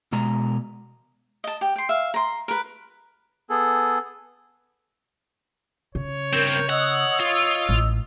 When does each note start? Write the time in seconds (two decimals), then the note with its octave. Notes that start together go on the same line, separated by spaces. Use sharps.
0.12 B2 G#3 A#5
1.44 D#5 A5
1.61 G4
1.76 G5 C6
1.89 E5 F5
2.14 A#5 C6
2.48 A#4 B4
3.50 B3 G#4 A4
5.95 C#3 C#5
6.33 G2 C4 A#4 G6
6.69 D#5 F#5 D#6 E6
7.20 F4
7.69 A1